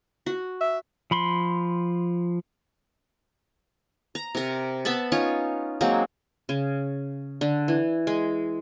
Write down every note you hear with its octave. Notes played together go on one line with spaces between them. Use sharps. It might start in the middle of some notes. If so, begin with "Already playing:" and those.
F#4
E5
F3 B5 C6
A#5
C3 A#4
B3 E5 A5 B5
C#4 D#4 F4 C#5
F#3 G#3 A#3 C4
C#3
D3
E3
G#3